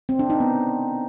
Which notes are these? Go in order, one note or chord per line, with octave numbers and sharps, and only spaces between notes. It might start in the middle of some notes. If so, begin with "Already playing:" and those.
C4
D4
D#4
B3